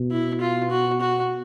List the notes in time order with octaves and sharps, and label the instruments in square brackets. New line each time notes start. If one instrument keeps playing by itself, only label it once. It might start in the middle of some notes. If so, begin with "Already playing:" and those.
Already playing: [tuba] B2
[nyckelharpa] E4
F4
F#4
F#4